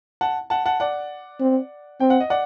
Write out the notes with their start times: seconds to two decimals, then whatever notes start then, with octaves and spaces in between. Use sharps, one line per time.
0.21 F#5 A5
0.50 F#5 A5
0.65 F#5 A5
0.80 D5 F#5
1.40 C4
2.00 C4 G5
2.10 F#5
2.20 D#5
2.30 D5 F#5